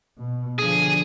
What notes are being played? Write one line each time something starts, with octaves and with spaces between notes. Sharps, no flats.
B2
D3 F3 G#4